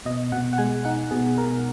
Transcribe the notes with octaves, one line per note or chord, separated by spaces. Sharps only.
B2 D#5
B2 F#5
F#5
G#3 G#5
D#4 F#5
B2 G#4
B2 A#4